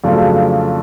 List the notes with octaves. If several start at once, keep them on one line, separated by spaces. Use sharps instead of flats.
F2 C#3 F#3 A3 D4